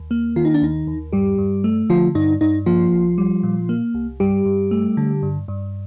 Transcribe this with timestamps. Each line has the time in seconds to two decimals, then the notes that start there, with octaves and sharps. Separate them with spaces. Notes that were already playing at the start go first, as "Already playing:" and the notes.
Already playing: D#2
0.11 A#3
0.36 D#3 F4
0.45 D#4
0.54 D4
0.62 D#2 D#4
0.87 D#2
1.13 G2 G3 G4
1.38 G2
1.64 A3
1.89 D3 F3 F4
2.15 G2 D#4
2.41 G2 D#4
2.66 F3 A#3 F4
2.92 C2
3.18 G3
3.43 A#2
3.69 A#3
3.94 C2
4.20 G2 G3 G4
4.45 G2
4.71 A3
4.97 D3
5.22 G2
5.48 G2